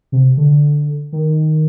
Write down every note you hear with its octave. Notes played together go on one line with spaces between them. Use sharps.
C3
D3
D#3